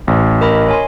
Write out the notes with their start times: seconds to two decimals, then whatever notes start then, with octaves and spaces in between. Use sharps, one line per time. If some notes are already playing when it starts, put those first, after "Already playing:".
0.07 A1
0.41 A#4 D#5 B5
0.68 C#5 G#5 C6